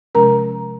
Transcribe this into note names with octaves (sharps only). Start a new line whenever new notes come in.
C3 F3 G#3 C#4 A#4 A#5